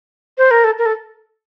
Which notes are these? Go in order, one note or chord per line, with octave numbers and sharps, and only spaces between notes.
C5
A#4
A4
A#4
A4